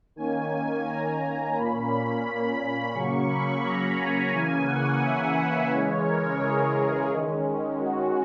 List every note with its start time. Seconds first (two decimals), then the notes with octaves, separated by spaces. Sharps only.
0.16 D#3 A#3 C#4 G#5
0.85 A#5
1.55 A#2 A#3 C#4 B5
1.90 B5
2.25 B5
2.59 B5
2.93 C#3 F#3 A#3 C#4 C#6
3.28 B5
3.64 A#5
3.98 G#5
4.33 C#3 E3 A#3 C#4 G#5
4.67 F#5
5.02 E5
5.37 B4
5.71 C#3 E3 G#3 C#4 C#5
6.06 A#4
6.40 G#4
7.09 D#3 G#3 C#4
7.80 F#4